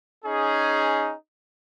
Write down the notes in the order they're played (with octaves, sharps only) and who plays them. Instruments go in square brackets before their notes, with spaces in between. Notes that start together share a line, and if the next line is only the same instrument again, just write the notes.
[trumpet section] C#4 D#4 G#4